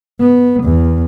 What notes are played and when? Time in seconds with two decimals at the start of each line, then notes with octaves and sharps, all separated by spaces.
0.20 B3
0.64 E2